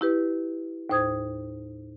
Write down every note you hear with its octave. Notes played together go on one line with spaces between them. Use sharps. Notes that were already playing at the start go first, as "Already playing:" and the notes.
E4 G4 B4
D#2 A2 C5 D#6 G#6